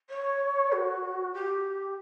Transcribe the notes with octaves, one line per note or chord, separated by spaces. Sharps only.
C#5
F#4
G4